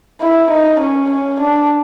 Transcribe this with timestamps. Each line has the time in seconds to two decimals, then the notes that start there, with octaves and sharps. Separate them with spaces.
0.21 E4
0.51 D#4
0.80 C#4
1.10 C#4
1.41 D4